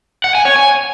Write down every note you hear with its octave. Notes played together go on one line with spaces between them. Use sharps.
F#5
G#5
C#5
G#5